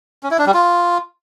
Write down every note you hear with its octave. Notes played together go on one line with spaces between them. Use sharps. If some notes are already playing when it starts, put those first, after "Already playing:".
C#4
E4
D4
G3
F4